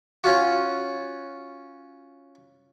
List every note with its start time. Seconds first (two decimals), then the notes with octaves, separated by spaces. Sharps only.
0.24 C#4 F4 F#4